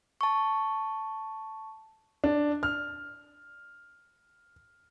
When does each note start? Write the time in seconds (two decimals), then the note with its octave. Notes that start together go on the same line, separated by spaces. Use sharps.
0.21 A5 C#6
2.24 D4
2.63 F6